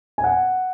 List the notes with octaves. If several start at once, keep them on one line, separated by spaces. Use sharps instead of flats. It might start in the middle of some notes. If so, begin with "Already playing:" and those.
G#5
F#5